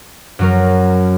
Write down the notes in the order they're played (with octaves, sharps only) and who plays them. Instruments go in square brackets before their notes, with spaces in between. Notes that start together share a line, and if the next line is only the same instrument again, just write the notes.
[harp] F#2 F#3 A#4